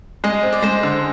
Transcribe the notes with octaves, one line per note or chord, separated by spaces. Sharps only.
G#3 D#5
C4
D5
G#3 C5
D3